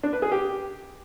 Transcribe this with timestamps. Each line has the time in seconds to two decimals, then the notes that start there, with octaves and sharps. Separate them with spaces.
0.03 D4
0.13 B4
0.22 G#4
0.32 G4